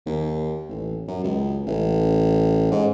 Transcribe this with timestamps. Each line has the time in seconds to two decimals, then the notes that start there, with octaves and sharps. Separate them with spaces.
0.06 D#2
0.69 A1
1.08 F#2
1.24 C#2
1.67 A1
2.72 G#2